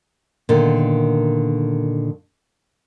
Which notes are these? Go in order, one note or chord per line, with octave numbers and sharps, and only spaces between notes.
A#2 D3 D#3 B3